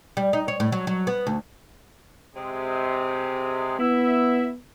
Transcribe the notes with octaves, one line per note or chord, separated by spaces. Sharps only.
G3
D#4
C#5
A2
F#3
F#3
B3
D2
C3 G#3
B3 E4 E5